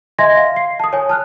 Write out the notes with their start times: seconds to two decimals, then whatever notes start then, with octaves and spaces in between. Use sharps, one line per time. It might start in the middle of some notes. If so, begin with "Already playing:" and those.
0.19 D#5 E5 G#5 C6 G#6 A#6
0.37 F5
0.56 C7
0.80 A5 D#6
0.93 C#5 G#5
1.09 A5 F6 F#6